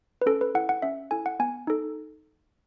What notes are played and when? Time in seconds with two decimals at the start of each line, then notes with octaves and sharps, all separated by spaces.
0.22 B4
0.26 C#4 A4
0.41 B4
0.55 E4 A4 F#5
0.69 F#5
0.82 C#4 E5
1.11 E4 A4 G#5
1.26 F#5
1.40 B3 G#5
1.67 D#4 A4